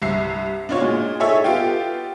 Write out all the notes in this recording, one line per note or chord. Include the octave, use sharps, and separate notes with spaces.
C2 G2 E5 C7
D4 D#4 F4 F#4 C#5
A#2 G#3
D#4 E4 G#4 A4 C#5 E5
B3 F4 G4 A4 F5 G5